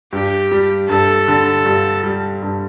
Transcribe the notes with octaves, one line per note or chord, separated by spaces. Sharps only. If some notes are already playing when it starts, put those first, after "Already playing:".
G2 G4
G3
G2 A4
D3
G2
G3
G2